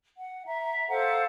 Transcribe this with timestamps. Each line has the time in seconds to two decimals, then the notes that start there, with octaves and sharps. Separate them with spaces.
0.16 F#5
0.46 E5 A#5
0.89 A4 C5 F5 F#5